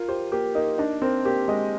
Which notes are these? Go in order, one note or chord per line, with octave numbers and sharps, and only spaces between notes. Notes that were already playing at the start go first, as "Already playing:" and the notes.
Already playing: F4 A#4
G4 C5
A#3 G4
A#3 D#4
D4 D#4
C4 A#4
A#3 G4
G#3 D#5